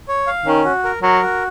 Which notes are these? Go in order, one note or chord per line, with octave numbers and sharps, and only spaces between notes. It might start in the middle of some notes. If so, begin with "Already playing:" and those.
C#5
F5
D#3 C#4
F#4
A#4
F#3 A#4
F#4